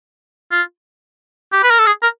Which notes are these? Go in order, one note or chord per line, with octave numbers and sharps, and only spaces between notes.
F4
G4
B4
A#4
A4
G#4
A#4